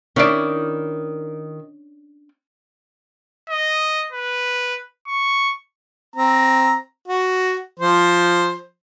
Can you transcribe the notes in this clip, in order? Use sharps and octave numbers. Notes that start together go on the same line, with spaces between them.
D#3 C#4 D4 E4 D5
D#5
B4
C#6
C4 A#5
F#4
F3 C5